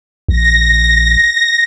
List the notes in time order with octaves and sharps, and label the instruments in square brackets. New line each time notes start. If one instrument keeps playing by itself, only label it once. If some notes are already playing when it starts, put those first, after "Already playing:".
[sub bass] A#1 [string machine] A#6